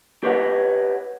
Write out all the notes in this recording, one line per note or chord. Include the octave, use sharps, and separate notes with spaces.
G4 B4 C#5 D#5 F5 F#5